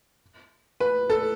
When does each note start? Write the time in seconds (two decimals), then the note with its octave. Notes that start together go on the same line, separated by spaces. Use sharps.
0.80 B4
1.10 A4